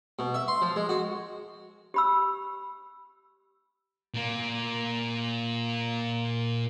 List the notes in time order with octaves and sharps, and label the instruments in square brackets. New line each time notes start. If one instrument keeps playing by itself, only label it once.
[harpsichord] B2
E5
C6
F3
G#3
F#4
[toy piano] G4 B5 E6
[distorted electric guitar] A#2 A#3